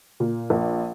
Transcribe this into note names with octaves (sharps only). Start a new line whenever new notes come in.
A#2
A#1